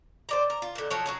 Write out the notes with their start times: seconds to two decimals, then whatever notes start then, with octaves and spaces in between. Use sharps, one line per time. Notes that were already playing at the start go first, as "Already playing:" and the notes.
0.29 C5 D5 A#5
0.50 A#4
0.62 F4
0.75 A#2 D3
0.90 F3 F#3 C#5
1.06 F#3 C#4 G#4